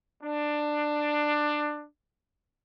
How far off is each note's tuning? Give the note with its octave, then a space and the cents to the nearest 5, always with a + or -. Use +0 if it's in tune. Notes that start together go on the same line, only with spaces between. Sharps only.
D4 +15